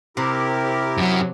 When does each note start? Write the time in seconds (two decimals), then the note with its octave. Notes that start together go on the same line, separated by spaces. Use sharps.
0.17 C3 E4 G4 A#4
0.97 F#2 F#3